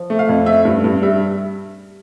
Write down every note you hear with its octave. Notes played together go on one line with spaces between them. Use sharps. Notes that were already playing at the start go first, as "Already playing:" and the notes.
Already playing: F3
A3
F5
F2
A3 E5
G2
G2
G3 E5